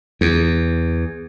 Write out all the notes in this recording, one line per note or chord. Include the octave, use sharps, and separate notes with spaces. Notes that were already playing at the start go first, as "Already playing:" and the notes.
E2